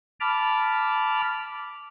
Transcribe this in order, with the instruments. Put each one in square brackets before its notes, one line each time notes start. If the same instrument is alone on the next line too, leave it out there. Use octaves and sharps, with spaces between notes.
[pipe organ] A5 B5 D6 F6